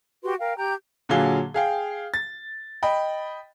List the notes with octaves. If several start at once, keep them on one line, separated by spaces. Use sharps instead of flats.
F#4 G4 B4 C6
A#4 F5 G5
G4 G5 A#5 G6
A#2 D3 F#3 G#4 F5 G7
G#4 F5 G5
A6
D#5 G5 B5